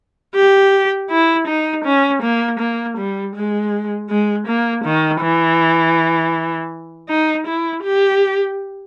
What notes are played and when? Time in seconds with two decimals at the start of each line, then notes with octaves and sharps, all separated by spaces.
0.35 G4
1.10 E4
1.47 D#4
1.84 C#4
2.22 A#3
2.59 A#3
2.97 G3
3.35 G#3
4.09 G#3
4.47 A#3
4.85 D#3
5.21 E3
7.09 D#4
7.47 E4
7.83 G4